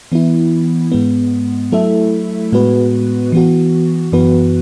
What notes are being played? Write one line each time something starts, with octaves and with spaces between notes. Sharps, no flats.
E3 B3 E4
G#2 G#3 B3
F#3 A3 E4 A4 E5
A2 G#3 B3 F#4 B4
E3 B3 F#4
F#2 E3 B3 F#4 B4